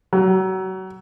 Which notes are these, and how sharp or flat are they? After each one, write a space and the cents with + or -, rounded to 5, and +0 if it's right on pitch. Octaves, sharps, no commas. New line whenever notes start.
F#3 +30